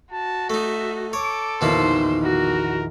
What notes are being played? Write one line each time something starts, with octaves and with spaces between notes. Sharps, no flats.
F#4 A5
A3 D#4 E5
A4 C#5 D6
A#1 E2 B2 D#3 A#3 E4 C5
F#4 A#4